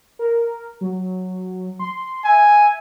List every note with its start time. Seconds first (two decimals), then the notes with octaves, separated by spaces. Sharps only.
0.19 A#4
0.81 F#3
1.79 C6
2.25 E5 G#5